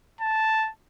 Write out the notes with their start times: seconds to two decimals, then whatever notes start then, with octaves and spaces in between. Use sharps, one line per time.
0.21 A5